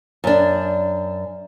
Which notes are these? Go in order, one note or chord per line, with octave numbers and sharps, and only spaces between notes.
F#2 D4